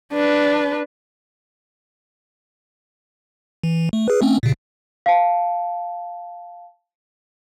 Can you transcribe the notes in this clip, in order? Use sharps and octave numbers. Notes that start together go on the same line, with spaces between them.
D4 B4
E3
A3
G#4 B4
A3 C4 C#4
A#2 C#3
F5 A5